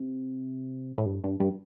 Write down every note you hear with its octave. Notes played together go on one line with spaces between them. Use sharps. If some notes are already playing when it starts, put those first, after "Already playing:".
Already playing: C3
A2
G2
G2
G2